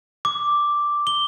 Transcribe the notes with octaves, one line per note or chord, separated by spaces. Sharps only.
D6
G7